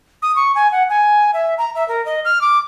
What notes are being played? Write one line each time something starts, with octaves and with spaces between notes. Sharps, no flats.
D#6
C#6
G#5
F#5
G#5
E5
A#5
E5
A#4
D#5
F6
D6